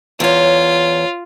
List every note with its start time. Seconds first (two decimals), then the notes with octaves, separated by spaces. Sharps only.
0.20 E2 F4 C#5